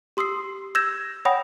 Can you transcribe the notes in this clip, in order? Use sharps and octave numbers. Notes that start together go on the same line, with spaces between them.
G4 C6 D#6 E6 C7
E6 G6 G#6 A#6 E7
C#5 F#5 G5 B5 D#6 A#6